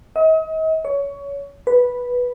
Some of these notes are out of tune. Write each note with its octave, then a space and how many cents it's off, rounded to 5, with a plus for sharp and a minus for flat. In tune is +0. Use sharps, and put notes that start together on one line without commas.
D#5 +40
C#5 +20
B4 -5